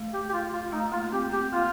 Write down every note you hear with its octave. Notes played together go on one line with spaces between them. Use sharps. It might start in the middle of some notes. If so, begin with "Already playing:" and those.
Already playing: A3
G4
G4
F4
F4
A3 D#4
A#3 F4
C4 G4
C4 G4
A#3 F4